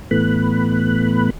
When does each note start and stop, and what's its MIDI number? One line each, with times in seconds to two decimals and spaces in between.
0.11 1.30 45
0.11 1.30 52
0.11 1.30 57
0.11 1.30 59
0.11 1.30 83
0.11 1.30 90